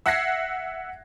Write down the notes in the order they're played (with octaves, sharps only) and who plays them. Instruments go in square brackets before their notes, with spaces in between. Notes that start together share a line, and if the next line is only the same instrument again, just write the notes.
[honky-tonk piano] E5 F#5 F#6 G#6 A#6 C7